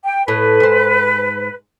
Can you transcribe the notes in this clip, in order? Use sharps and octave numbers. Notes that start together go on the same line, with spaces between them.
G5
A2 B4
G#2 C5